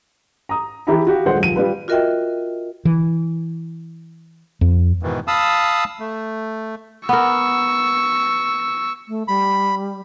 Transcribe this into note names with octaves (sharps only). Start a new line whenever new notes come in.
A#5 D#6
E3 G4 G#4 E5 A#5 B5
F#4 G4 F5
D#1 D3 G#3 C5 F#5
D#1 F3 D#7
G3 F4 B4
F4 F#4 A#4 D#5 E5 G5
E3
F2
G#2 B2 D#3 E3
F5 A5 B5 D#6 E6
A3
B3 A#4 C#6 E6
A3
G3 B5